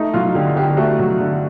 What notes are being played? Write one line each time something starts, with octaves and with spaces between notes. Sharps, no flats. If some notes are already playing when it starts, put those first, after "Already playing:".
Already playing: A3 D#4
F#3 F4
D3 G4
D3 G4
A3 F#4
F#3
D3